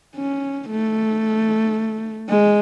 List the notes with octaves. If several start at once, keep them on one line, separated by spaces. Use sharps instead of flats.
C#4
A3
G#3